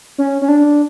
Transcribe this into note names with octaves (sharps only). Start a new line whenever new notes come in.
C#4
C#4
D4